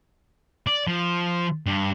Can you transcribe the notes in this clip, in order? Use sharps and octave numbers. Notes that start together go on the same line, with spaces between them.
D5
F3
G2